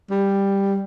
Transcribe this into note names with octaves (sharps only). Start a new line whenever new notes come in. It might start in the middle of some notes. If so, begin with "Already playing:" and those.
G3